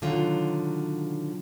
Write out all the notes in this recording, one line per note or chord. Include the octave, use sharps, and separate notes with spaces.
B2 D3 D#3 F#3 F4